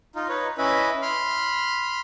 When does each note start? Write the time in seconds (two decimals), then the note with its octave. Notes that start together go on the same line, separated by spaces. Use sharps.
0.15 D#4 F4
0.29 D#4 B4 C#5
0.58 C#4 E4 B4 D#5 E5 B5
1.02 B5 C6 F6